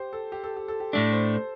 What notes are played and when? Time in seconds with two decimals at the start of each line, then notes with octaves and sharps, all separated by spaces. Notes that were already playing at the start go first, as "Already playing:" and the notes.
Already playing: G4 C5
0.13 A4
0.32 G4
0.44 A4
0.57 G4
0.68 A4
0.80 G4
0.93 A2 A3 D4 A4
1.13 C5
1.34 C5